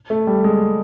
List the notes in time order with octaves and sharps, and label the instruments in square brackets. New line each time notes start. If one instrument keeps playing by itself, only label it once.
[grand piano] A3
G3
G#3